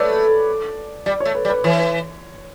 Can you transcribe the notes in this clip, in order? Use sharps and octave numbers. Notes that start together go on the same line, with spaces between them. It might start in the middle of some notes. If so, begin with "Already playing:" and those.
Already playing: A3 B4 C#5 D5
G3 D5
A3 C#5
B4
G3
B4
E3 C#5